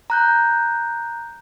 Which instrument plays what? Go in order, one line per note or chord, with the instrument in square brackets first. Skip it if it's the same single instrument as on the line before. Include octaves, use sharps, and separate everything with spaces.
[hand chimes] A#5 F#6 G6